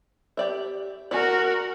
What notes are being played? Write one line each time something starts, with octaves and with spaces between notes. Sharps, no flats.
G4 D5 E5
F#4 A#4 D5 G#5